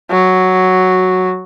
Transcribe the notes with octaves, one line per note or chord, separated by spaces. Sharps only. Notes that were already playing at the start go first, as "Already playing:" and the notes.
F#3